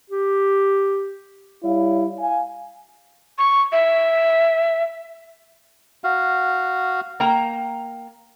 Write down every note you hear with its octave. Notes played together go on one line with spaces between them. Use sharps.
G4
G3 E4 C#5 F5
F5 G#5
C#6
E5
F#4 F5
A#3 G5 A#5